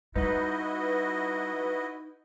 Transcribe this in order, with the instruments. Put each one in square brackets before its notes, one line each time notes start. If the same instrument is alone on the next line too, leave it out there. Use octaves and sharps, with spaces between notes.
[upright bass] G3 [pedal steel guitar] D#4 [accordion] E4 F#4 D#5 [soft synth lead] B4